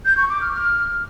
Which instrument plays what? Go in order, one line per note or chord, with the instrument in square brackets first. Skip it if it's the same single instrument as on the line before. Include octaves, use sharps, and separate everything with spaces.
[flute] G6
C#6
D6
F6
F6